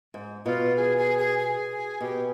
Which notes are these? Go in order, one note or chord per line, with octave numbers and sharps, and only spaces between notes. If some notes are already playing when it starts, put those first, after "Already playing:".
G#2
B2 F4
G#4
G#4
G#4
G#4
B2 G4